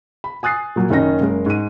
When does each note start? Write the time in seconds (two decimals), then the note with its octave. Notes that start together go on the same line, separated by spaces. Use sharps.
0.24 B5
0.43 G#5 D#6 F#6 A6 C7
0.76 A#2 F#3
0.90 F#1 D#3 C#4 D#4 A#6
1.20 F#1 G#3 A#4
1.46 G#2 D#7